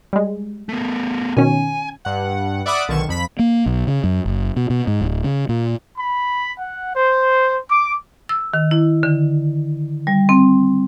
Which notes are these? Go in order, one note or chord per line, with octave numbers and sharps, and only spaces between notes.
G3 G#3
A3 B3
B2 D#3 C#4 G#5
G2 F#5
D5 E5 F#5 B5 D6 D#6
B1 D3 D#3 C#6 E7
F2 B5 B6
A#3
B1
C#3
F#2
F#1
B2
B2
G#2
D1
C#3
A#2
B5
F#5
C5
D6
E6
D#3
E4
D3
G3
C4